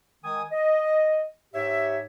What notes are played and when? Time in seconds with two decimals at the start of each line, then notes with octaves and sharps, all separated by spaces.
0.24 D#3 G#3 G#5 D#6
0.52 D#5
1.54 G#2 G4 C#5 E5